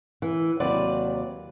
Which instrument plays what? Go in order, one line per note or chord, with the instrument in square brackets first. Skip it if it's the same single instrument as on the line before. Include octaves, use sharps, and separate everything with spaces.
[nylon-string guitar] E3
D#2 C3 F#3 F#4 B4 D5